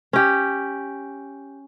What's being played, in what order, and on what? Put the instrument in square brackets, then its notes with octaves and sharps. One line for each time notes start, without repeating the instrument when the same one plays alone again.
[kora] C#4 G4